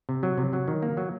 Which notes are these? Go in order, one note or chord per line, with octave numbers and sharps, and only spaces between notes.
C3
F#3
C3
F#3
D#3
A#3
F#3